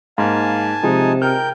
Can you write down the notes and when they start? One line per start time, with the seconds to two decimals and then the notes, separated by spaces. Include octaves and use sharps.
0.18 G#2 A#3 F5 G#5 A5
0.83 C3 F3 G#3 D#4
1.22 A#4 G5 F6 G6